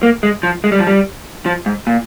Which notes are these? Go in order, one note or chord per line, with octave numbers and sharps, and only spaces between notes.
A#3
G#3
F3
G#3
G3
F3
G3
F3
G#2
A#2